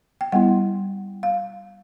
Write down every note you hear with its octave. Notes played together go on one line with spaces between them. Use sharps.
G5
G3 B3 E4 F#5
F5